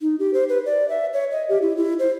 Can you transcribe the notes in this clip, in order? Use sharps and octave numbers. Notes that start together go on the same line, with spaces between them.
D#4
G4
C5
B4
D5
E5
C#5
D#5
G4
E4
E4
C5